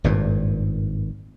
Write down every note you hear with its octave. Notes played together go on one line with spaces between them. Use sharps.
G#1 G2 A#2